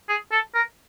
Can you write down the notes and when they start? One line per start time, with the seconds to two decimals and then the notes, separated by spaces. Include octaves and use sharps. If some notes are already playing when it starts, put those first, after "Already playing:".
0.09 G#4
0.32 A4
0.55 A#4